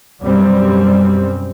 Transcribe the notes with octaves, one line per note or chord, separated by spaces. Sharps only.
F#2 B2 G3 C4